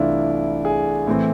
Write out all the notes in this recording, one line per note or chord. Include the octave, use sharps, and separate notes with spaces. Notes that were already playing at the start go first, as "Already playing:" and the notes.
Already playing: C2 C3 E3 A3 D4 E4 F4
G#4
A2 E3 A3 C4